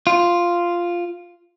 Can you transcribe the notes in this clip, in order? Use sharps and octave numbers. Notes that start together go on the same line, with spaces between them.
F4